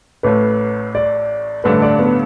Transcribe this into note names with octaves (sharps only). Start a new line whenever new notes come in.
A1 A2 A3 B4
D5
A1 G2 D3 A3 D4 B4
D5
B3